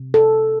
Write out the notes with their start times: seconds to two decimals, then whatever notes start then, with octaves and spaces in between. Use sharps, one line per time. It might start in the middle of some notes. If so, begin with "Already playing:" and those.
Already playing: C3
0.14 A4